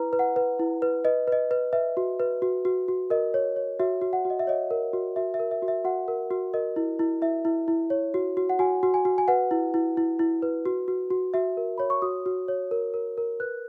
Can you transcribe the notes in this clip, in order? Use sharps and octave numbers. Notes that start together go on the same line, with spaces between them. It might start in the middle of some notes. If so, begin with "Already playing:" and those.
Already playing: E4 B4 A#5
B4
F#5
B4
E4
B4
B4 D#5
B4 D#5
B4
B4 E5
F#4
B4
F#4
F#4
F#4
A#4 D#5
C#5
C#5
F#4 E5
F#4
F#5
F#4
D#5
E5
C#5 D#5
A#4
F#4
F#4 E5
E5
A#4
E5
F#4
E5
F#4 F#5
A#4
F#4
A#4 D#5
E4
E4
E4 E5
E4
E4
C#5
F#4
F#4
F#5
F#4 G#5
F#4
G#5
F#4
G#5
B4 F#5
E4
E4
E4
E4
B4
F#4
F#4
F#4
F#4 E5
A#4
C#5 B5
C#6
F#4 D#6
F#4
C#5
A#4
A#4
A#4
B4 F#6